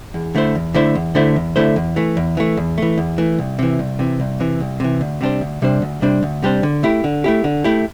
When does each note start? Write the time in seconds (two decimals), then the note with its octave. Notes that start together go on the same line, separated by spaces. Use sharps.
0.14 E2
0.35 D3 A3 E4 C5
0.55 E2
0.74 D3 A3 E4 C5
0.95 E2
1.15 D3 A3 E4 C5
1.36 E2
1.56 D3 A3 E4 C5
1.76 E2
1.96 E3 A3
2.17 E2
2.37 E3 A3
2.57 E2
2.78 E3 A3
2.98 E2
3.18 E3 A3
3.39 C2
3.59 C3 E3
3.79 C2
3.99 C3 E3
4.20 C2
4.40 C3 E3
4.60 C2
4.80 C3 E3
5.01 D2
5.21 C3 G3 D4 C5
5.41 D2
5.62 C3 G3 D4 C5
5.82 D2
6.02 C3 G3 D4 C5
6.23 D2
6.43 C3 G3 D4 C5
6.63 D3
6.83 A3 E4 G4
7.04 D3
7.24 A3 E4 G4
7.44 D3
7.64 A3 E4 G4